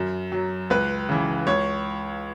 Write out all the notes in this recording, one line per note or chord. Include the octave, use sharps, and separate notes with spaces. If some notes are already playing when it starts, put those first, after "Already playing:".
Already playing: F#2
F#3
C#2 B4
C#3 E3
C#2 C#5